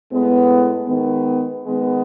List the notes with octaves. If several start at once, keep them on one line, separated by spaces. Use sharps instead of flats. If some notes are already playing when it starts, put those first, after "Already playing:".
A2 G#3 B3
D#3 G#3 B3
D#3 G#3 B3